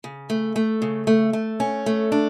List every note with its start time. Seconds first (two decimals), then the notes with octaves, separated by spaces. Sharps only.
0.04 C#3
0.30 A3
0.56 A3
0.82 C#3
1.07 A3
1.33 A3
1.60 C#4
1.86 A3
2.12 D4